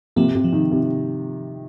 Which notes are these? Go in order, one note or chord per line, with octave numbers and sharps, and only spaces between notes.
C3 F3 A#3
C3
F3
D#3
C3